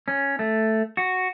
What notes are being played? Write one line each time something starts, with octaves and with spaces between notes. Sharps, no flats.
C#4
A3
F#4